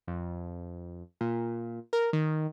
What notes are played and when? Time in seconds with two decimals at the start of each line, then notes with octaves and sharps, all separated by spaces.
0.08 F2
1.21 A#2
1.93 A#4
2.13 D#3